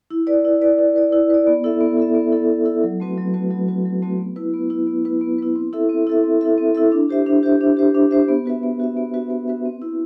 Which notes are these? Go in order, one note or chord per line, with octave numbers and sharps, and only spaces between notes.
E4
B4 D5
E4
B4 D5
E4
B4 D5
E4
B4 D5
B3
E4 A4 E5
B3
E4 A4 E5
B3
E4 A4 E5
B3
E4 A4 E5
F#3
A3 C4 F#4 B4
F#3
A3 C4 F#4 B4
F#3
A3 C4 F#4 B4
F#3
A3 C4 F#4 B4
B3
E4 B4
B3
E4 B4
B3
E4 B4
B3
E4 B4
C4
E4 A4 E5
C4
E4 A4 E5
C4
E4 A4 E5
C4
E4 A4 E5
D4
G4 C5 E5
D4
G4 C5 E5
D4
G4 C5 E5
D4
G4 C5 E5
B3
F#4 B4 E5
B3
F#4 B4 E5
B3
F#4 B4 E5
B3
F#4 B4 E5
C4
E4 B4